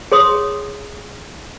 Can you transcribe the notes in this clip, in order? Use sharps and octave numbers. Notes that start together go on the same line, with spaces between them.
G#4 C#5 C6 D#6